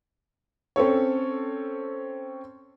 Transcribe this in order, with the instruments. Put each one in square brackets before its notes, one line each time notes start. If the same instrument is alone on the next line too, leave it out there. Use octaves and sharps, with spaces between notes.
[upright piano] C4 C#4 A4 C#5